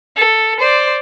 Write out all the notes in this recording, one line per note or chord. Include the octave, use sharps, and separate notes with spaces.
A4
C5 D5